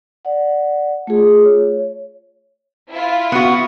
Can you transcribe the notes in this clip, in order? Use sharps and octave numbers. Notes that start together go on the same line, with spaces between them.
D5 F#5
A3 F4 G#4
C#5
E4 F4
B3 F#4